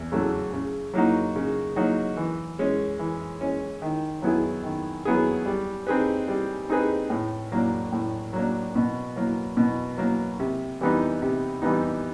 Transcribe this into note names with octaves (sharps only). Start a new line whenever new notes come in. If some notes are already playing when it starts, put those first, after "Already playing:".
Already playing: E2
C#3 F#3 A3
C#3
F#3 A#3 D#4 F#4
C#3
F#3 A#3 D#4 F#4
E3
G#3 C#4
E3
G#3 C#4
D#3
F#3 B3 E4 G#4
D#3
F#3 B3 E4 G#4
G3
C4 D#4 G#4 B4
G3
C4 D#4 G#4 B4
A2
F#3 A#3 D4
A2
F#3 A#3 D4
B2
F#3 A#3
B2
F#3 A#3
C3
E3 G3 B3 D#4
C3
E3 G3 B3 D#4